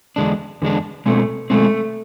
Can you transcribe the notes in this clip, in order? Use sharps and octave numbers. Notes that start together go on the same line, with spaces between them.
E2 D3 G#3 D4
E2 D3 G#3 D4
B2 G#3 A3 C4
B2 G#3 A3 C4